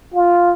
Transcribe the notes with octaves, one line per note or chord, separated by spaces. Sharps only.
F4